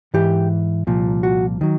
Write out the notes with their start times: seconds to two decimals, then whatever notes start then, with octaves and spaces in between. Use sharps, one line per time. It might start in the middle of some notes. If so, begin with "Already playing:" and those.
0.14 G#2 E3 G4
0.87 C2 A#2 F3
1.23 F#4
1.61 D#3 F#3